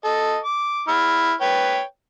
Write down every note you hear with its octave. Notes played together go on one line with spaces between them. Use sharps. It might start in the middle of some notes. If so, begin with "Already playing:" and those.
A4 D#5
D6
E4 F6
B4 C#5 G5